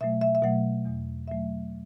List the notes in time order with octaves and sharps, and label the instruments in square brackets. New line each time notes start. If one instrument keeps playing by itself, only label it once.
[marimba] B2 F#3 A3 E5
E5
E5
B2 F#3 A3 F#5
E2 B2 F#3 A3
E2 B2 F#3 A3 E5